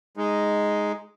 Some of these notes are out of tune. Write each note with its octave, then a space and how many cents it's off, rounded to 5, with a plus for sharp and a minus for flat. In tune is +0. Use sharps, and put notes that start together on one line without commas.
G#3 +0 D#4 +0